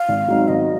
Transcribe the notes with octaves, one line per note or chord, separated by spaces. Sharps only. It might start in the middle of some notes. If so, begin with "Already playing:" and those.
Already playing: F5
G#1
G#2 F#3 C4 D#4
G#1 D#5